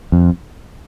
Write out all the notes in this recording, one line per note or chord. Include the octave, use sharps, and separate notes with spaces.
F2